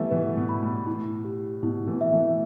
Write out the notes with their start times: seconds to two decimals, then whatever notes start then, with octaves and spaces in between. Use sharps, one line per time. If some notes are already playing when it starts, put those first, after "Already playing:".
Already playing: E3 G3 A3 B3 E5
0.11 B2 E3 B4
0.37 B2
0.49 B5
0.63 A2
0.87 E4
1.25 G4
1.63 B2 E4
1.87 E3 A3
2.01 E5
2.12 E3 A3